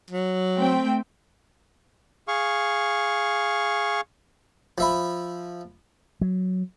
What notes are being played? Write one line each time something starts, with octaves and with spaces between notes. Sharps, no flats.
F#3
A3 C4 G5
G#4 F5 C#6
F3 E5 B5
F#3